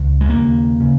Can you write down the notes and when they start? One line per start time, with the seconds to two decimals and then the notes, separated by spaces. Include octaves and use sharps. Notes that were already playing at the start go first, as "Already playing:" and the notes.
Already playing: C#2 C#3
0.21 G#3
0.29 D#2 C#3 A#3
0.80 C#3